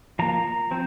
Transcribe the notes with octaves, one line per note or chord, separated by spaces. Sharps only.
F3 A#3 A#5
F3 C4